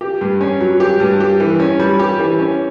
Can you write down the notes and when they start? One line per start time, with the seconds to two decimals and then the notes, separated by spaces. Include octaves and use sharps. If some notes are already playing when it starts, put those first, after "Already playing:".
0.01 G4
0.21 G2
0.41 C#4
0.60 F#3
0.80 G4
1.00 G2
1.20 G4
1.40 E3
1.60 C#4
1.80 G3
1.99 G4
2.19 E3
2.39 C#4